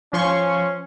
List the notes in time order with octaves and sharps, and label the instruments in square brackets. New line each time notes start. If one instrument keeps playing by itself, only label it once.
[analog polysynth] F3 C6 C#6 [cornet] C#4